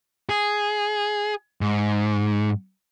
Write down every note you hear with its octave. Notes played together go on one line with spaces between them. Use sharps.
G#4
G#2